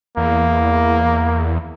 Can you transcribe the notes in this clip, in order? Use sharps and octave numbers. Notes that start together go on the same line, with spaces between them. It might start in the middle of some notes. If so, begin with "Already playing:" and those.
E2 A#3